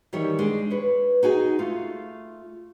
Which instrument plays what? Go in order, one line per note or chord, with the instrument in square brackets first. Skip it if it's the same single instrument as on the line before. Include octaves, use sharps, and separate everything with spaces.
[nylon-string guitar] D#3 E3 G3 G4 C#5
G#3 D4 D5
B4 C#5
D#4 F#4 G#4 G#5
A3 F4